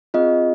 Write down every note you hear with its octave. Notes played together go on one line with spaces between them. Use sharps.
C4 F4 G#4 D#5